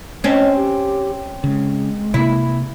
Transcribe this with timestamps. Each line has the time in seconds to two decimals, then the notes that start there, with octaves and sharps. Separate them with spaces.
0.24 C4 C#4 D#5
0.56 G4
1.44 C#3 G#3
2.14 C3 A#3 E4